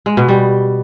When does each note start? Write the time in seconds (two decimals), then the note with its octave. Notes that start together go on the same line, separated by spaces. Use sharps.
0.06 G#3
0.17 B2
0.28 G3